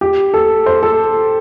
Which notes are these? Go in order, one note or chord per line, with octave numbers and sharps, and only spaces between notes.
G4
A4
C5
A4